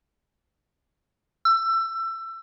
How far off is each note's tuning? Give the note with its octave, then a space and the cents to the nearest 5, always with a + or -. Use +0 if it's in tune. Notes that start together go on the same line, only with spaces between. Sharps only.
E6 +25